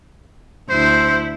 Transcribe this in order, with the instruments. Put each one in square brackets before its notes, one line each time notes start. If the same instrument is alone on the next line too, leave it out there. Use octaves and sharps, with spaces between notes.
[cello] D2 E4 [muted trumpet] C5